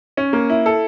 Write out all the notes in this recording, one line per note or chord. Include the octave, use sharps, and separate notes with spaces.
C#4
A#3
E4
A4